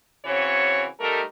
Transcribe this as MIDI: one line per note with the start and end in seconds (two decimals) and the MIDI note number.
0.25 0.85 49
0.25 0.85 52
0.25 0.85 60
0.25 0.85 66
0.25 0.85 73
1.00 1.21 55
1.00 1.21 57
1.00 1.21 63
1.00 1.21 67
1.00 1.21 69
1.00 1.21 70